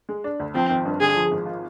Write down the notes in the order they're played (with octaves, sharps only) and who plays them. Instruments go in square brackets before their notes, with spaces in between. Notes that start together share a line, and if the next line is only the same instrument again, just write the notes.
[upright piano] G#3
D4
D2
[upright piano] F3 [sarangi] C4
[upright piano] G#1
G2
[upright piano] D3 [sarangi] G#4
[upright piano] F3
G#1
F4